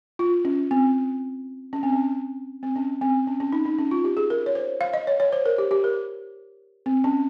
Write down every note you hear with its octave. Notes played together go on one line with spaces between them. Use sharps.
F4
C#4
C4
C#4
C4
C#4
C4
C#4
C4
C#4
C#4
D#4
D#4
C#4
F4
G4
G#4
A#4
C#5
C5
F5
D#5
C#5
C#5
C5
A#4
G4
G4
A#4
C4
C#4